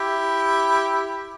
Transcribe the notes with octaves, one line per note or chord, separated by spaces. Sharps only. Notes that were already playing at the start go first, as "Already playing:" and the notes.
Already playing: E4 G4